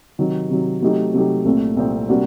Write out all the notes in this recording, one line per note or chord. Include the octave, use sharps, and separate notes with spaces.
C3 D#3 F#3
C3 D#3 F#3
C3 F#3 A3 D#4 G4
C3 F#3 A3 D#4 G4
C2 A#2 A3 C4
C2 A#2 A3 C4
C3 G3 A#3 D4 F#4